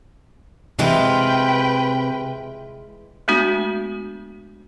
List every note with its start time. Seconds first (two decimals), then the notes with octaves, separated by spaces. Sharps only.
0.79 C3 E3 G#3 F4 B4 G5
3.28 G#3 A3 B3 D4 F#4